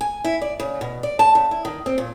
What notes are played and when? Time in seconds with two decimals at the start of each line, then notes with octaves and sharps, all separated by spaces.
0.01 G#5
0.25 E4
0.41 D5
0.60 C#3
0.81 B2
1.03 D5
1.19 A5
1.35 C#3
1.51 E4
1.65 D#3
1.86 C4
1.98 A#2